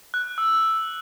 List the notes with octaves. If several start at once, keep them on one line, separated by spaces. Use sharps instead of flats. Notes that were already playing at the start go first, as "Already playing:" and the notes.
F#6
E6